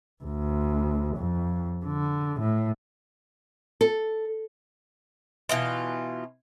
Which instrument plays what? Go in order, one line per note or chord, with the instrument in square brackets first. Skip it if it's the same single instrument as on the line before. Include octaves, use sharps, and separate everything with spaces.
[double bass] D2
F2
D3
A2
[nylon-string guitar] A4
[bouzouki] B2 E3 F4